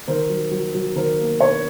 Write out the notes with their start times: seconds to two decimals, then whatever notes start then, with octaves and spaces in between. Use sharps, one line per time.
0.08 D#3 A#4 C5
0.29 F#3
0.51 F#3
0.75 F#3
0.96 D#3 A#4 C5
1.18 A#3
1.40 D4 B4 C#5